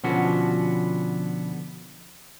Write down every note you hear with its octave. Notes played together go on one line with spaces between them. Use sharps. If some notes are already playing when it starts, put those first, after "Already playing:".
B2 D3 F3 B3 C#4 F#4